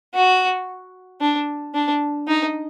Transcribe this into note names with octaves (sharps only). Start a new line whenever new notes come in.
F#4
D4
D4
D#4